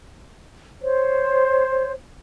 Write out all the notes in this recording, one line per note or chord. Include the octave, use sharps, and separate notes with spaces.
C5 C#5